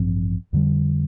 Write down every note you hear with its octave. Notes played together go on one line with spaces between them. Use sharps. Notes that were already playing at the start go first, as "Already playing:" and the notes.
Already playing: A1 G2 F3 C4
F2 D3 G3